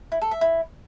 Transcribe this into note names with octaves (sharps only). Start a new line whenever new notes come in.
E4
A4
E5
E4